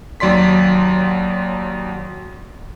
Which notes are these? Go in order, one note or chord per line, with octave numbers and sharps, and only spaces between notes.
D#2 F#3 D5 C6 B6